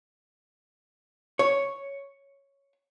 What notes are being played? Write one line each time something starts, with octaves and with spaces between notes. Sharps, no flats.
C#5